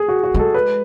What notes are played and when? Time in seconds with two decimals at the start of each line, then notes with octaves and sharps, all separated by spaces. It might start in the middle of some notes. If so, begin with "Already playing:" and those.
Already playing: G#4
0.08 F#4
0.23 F#4
0.34 G#3 A4
0.54 B4